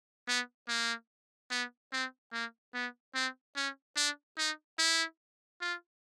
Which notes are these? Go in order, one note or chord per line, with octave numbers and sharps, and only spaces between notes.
B3
A#3
B3
C4
A#3
B3
C4
C#4
D4
D#4
E4
F4